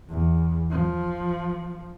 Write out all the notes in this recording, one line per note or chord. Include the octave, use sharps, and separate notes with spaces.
E2
F3